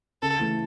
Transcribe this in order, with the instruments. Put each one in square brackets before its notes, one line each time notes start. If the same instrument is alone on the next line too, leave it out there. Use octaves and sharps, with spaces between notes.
[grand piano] C#3 [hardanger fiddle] A4
[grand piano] E3 A3